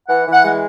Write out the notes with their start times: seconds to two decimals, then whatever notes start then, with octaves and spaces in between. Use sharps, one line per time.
0.09 E3 F#5
0.27 E3
0.32 F#5
0.44 G#3